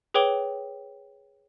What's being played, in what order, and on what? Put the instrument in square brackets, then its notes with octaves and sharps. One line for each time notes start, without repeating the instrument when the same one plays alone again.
[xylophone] G#4 B4 C#5 G5 D6 G7